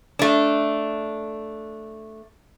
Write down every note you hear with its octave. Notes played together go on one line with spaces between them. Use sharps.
A3 D4